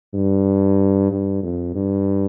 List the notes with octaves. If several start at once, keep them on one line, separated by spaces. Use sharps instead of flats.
G2
G2
F2
G2